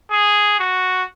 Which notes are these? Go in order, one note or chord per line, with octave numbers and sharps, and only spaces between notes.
G#4
F#4